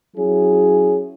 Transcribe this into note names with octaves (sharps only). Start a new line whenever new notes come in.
F#3 C#4 E4 G#4